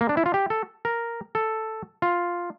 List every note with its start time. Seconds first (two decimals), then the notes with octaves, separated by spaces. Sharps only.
0.01 A#3
0.09 D4
0.17 E4
0.26 F4
0.34 G4
0.50 A4
0.85 A#4
1.35 A4
2.02 F4